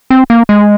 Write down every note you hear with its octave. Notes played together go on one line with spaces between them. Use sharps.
C4
A#3
G#3